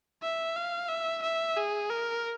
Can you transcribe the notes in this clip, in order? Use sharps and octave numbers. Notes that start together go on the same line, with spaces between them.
E5
F5
E5
E5
G#4
A#4